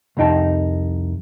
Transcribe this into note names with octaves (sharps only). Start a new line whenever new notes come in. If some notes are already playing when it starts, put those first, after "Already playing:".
C2 F2 D#4 G5 A5